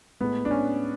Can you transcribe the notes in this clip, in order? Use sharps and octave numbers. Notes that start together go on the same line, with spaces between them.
A2 G#3 B3
D4
C#4